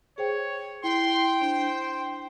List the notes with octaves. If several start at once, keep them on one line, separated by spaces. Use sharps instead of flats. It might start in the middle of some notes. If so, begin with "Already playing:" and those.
G#4 C5 C#5 G5
E4 G5 C6
D4 C5